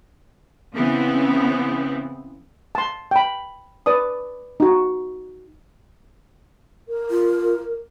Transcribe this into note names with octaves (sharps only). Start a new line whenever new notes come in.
C#3 E3 B3 C4
A5 C6
G5 B5
B4 D5 A5 D#6
D#4 F#4
A#4
F4